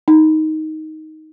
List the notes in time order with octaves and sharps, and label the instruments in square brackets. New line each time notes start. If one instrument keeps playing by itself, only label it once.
[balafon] D#4